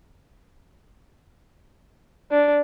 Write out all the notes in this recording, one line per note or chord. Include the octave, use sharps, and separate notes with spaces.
D4